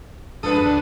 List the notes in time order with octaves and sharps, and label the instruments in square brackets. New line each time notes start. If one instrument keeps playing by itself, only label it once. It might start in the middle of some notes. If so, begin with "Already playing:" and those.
[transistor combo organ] F2 G#2 D#6 [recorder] D4 [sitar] A4 B4
[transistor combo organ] D2 D3